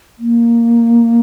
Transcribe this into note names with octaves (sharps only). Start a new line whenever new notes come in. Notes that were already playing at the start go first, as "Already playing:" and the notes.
A#3